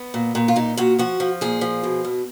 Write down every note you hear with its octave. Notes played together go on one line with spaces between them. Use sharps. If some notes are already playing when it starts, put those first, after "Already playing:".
Already playing: B3
A#2
A#2
F4
A#2 D#4
A#2 F#4
F3 F#4
F3
A#2 G#4
F3
B2
B2